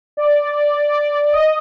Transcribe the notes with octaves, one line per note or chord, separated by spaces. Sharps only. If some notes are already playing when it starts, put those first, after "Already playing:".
D5
D#5